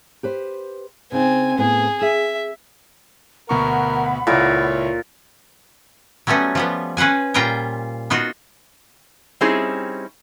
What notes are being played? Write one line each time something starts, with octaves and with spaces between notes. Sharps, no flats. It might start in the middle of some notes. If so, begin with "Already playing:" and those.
G4 B4 C5
C#3 C4 D#4 G#5
A2 B3 C4 G#4
G#4 E5
D2 B2 A#4 F#5 B5 C#6
C#2 A#2 E4 C#5
F#3 G3 A3 B3 C#4
F3 G3 B3
C#4 B4 C5 F#5 G#5
A#2 G3 F4 G5 G#5 A#5
B3 D#4 F4 F#4
G3 C4 C#4 D#4 E4 G#4